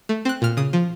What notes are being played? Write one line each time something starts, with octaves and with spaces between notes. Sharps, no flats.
A3
C4 F#6
A#2 F6
C#3 D#6
F3